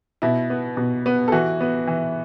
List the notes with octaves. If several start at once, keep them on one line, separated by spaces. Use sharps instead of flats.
B2 E4
B3
B2
B3
A4
E3 F#4
B3
E3